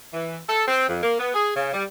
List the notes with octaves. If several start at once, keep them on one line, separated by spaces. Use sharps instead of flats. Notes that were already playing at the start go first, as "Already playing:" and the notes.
E3
A4
C4
F2
A#3
B3
G#4
C#3
G3